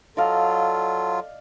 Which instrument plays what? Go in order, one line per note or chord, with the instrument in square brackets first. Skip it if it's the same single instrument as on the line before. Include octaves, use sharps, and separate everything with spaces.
[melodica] F#3 F4 [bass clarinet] A4 [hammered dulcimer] D5 D#5 F5